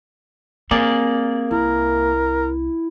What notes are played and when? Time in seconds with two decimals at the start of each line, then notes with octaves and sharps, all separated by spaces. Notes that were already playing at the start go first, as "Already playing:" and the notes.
0.71 A#3 C4 G#4 D5
1.51 C2 E4 A#4